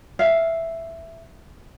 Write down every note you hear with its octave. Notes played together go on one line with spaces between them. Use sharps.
E5 F5